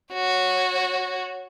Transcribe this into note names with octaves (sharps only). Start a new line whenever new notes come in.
F#4 C#5